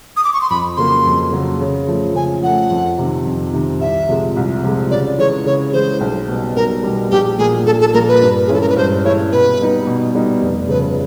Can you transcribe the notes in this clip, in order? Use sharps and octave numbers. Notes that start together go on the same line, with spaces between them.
D#6
D6
C#6
C6
F2 B5
C#3 F#3 A#3 C6
F2
C#3 F#3 A#3
C#3
F3 A3
C#3 G#5
F3 A3 F#5
F2
C3 D#3
F2
C3 D#3
C2 E5
C3 F3 G#3
C2
C3 F3 G#3
C#3 D5
E3 G#3 C#5
C#3 C#5
E3 G#3 C5
B1
B2 G3
B1 A#4
B2 G3
A#1 G4
A#2 F3 A#3 G#4
A#1 A4
A4
A#2 F3 A#3 A#4
B4
G2
G#4
E3 G#3 C#4 E4 A4
A#4
B4
G2 C5
C5
E3 G#3 C#4 E4 C#5
B2 B4
G3 B3 D#4
B2
G3 B3 D#4
F1
F2 C#3 B4